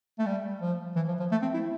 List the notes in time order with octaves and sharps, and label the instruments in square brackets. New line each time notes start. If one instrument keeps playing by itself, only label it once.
[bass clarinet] A3
G3
F3
E3
F3
F3
A3
C4
E4